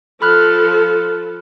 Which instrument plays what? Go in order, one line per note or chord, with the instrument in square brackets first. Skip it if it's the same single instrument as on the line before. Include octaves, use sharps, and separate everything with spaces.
[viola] F3 A4 [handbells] B5 F6 F#6